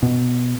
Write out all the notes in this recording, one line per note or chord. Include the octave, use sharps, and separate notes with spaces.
B2